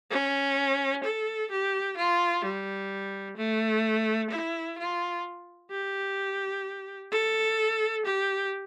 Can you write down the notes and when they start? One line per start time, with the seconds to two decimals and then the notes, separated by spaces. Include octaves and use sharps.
0.10 C#4
1.04 A4
1.51 G4
1.97 F4
2.44 G3
3.37 A3
4.30 E4
4.78 F4
5.71 G4
7.11 A4
8.05 G4